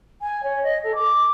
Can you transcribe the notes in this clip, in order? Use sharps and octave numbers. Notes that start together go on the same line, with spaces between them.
G#5
C#5
D#5
A4
D6